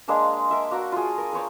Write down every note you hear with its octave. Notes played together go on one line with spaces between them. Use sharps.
G#3 A#3 D4 F5
A#4 E5
A#3 F#4 F#5 A#5
F4 G#4
A#4
A#4 C5 C#5 A5